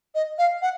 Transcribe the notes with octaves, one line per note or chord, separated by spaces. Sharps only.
D#5
F5
F#5